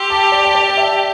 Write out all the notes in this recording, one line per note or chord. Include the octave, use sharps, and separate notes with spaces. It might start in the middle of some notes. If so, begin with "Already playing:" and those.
Already playing: G4 C6 E6
A5 D6
D5
A5
D5 G5
E5 A5